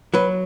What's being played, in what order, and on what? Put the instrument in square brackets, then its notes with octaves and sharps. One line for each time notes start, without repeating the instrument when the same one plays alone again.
[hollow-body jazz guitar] F#3 B4